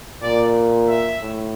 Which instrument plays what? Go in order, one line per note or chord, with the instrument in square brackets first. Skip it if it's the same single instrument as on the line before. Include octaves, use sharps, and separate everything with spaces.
[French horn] A#2 [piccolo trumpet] D5
[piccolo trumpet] E5
[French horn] A2